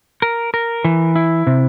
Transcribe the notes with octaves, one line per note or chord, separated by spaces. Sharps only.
A#4
A#4
E3
E4
C3